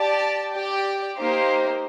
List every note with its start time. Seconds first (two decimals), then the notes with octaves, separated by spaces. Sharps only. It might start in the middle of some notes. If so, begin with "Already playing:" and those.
Already playing: G4 D5 A5
0.53 G4 D5 G5
1.16 A#3 D#4 G4 C5